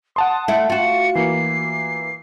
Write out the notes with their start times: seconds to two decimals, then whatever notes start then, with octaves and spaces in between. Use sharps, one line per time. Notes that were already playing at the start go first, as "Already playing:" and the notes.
0.16 F#5 A5 C6 D#6
0.48 A3 E4 C#7
0.70 F4 F#4 C#7
1.15 E3 A#3 C7